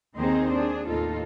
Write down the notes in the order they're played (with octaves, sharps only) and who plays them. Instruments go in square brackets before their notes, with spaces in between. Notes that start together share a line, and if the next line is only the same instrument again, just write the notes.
[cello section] D#2 D#3 C4 D#4 G#4 C5
D4 G#4
D#2 A2 D#4 F4 A4